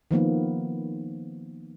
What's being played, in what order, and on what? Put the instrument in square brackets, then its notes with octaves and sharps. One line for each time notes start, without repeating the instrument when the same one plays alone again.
[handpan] D#3 F3 A#3 B3